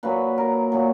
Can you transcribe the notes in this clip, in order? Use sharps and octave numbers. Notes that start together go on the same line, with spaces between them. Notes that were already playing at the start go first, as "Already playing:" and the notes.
A#2 F#3 B4
A#4
A#2 F#3